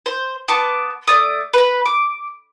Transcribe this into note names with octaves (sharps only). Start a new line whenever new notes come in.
C5
B3 A5 C#6 D6
A3 D5 D#6
B4 B5
D6